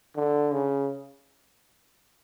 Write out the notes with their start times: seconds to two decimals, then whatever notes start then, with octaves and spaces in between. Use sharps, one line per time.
0.16 D3
0.52 C#3